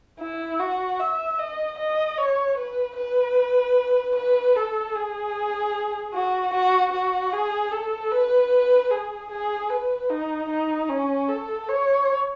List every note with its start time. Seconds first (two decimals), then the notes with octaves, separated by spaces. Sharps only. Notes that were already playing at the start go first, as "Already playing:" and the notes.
0.20 E4
0.60 F#4
1.00 E5
1.39 D#5
1.79 D#5
2.18 C#5
2.58 B4
2.97 B4
4.15 B4
4.56 A4
4.95 G#4
6.14 F#4
6.54 F#4
6.93 F#4
7.33 G#4
7.72 A4
8.12 B4
8.91 G#4
9.31 G#4
9.70 B4
10.10 D#4
10.50 D#4
10.89 C#4
11.29 A4
11.69 C#5